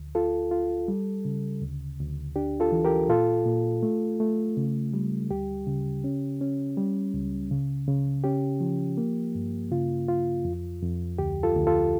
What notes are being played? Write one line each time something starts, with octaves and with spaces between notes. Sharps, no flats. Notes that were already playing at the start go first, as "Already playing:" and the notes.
Already playing: D2
F4 A4
F4
G3
C#3
D2
D2
D4 G4
F4 A4
E3
G4 A#4
A#2 F4 A4
A#2
A3
A3
C#3
G3
D2 G4
C#3
C#4
C#4
G3
C#2
C#3
C#3
C#4 G4
F3
A#3
G2
C#3 F4
F4
F2
F2
D2 G4
F4 A4
D2
F4 A4